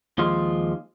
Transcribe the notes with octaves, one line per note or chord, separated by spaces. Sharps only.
D#2 F3 G#3 F4